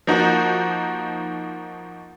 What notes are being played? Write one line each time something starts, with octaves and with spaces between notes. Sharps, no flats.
F3 A#3 D#4 F#4